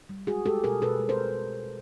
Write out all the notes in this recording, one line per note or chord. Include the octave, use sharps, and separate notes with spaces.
G3
G#3 F#4 G#4
G#3 G4 A4
B2 G#4 A#4
B2 A4 B4
G#3
A#4 C5